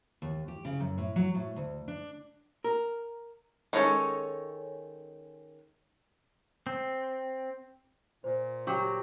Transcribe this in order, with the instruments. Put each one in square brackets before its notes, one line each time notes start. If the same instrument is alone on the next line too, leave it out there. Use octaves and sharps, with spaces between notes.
[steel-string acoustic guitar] D#2
G4
C#3
F#2
A2
F#3
A2
D2
D4
[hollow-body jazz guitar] A#4
[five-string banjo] D#3 G#3 C#4 A4 C#5
[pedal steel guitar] C4
[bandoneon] A#2 [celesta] C5
[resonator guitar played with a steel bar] F#3 [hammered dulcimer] G4